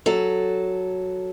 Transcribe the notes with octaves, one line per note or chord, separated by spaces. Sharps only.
F#3 A4